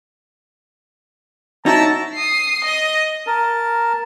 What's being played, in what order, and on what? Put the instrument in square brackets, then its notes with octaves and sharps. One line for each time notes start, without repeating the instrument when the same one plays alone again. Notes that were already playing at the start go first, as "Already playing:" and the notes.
[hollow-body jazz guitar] D#4 F#4 C#5 [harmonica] E4 A5 A#5
[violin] D#6 C7
D#5
[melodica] A#4 A5